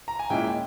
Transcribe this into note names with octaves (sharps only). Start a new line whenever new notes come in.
A#5
G#5
A#2 G#3 C#4 E4 G5